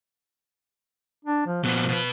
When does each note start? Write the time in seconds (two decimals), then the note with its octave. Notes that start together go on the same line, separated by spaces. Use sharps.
1.25 D4
1.46 F3
1.64 A#2 F3 B3
1.89 B2 B4